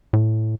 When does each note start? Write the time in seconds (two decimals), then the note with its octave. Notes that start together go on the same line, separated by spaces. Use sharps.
0.13 A2